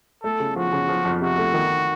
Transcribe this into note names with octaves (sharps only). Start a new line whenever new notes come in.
A3 A4
C#3
F3 F#4
C#3
F3
F2
C3 F#4
A3
D#3